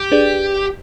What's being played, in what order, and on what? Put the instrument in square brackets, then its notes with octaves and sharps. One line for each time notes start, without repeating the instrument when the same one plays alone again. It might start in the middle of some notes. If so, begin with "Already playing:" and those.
Already playing: [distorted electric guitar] G4
[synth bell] D4 G#4 B4 D5